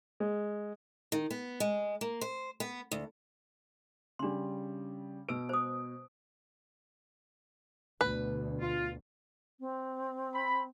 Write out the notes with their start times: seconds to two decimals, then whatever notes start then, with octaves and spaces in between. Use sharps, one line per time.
0.20 G#3
1.12 D#3
1.31 B3
1.60 G#3
2.01 A#3
2.21 C5
2.60 B3
2.92 D2
4.19 C#3 G3 D4 C6
5.29 B2 B4 E6 D7
5.49 C5 D#6
8.01 D2 B2 B4
8.61 F4
9.60 C4
10.34 B5